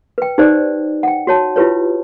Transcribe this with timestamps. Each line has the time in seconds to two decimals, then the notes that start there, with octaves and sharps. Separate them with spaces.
0.18 B4 G5
0.38 D#4 G4 B4 C5 D5 D#5
1.03 F#5 G5
1.27 F#4 C#5 A5
1.56 E4 F4 G4 B4 C#5